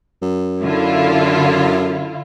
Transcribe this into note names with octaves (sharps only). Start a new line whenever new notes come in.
F#2
D3 E4 F4